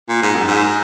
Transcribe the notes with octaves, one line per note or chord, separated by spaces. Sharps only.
A#2
G#2
F#2
G#2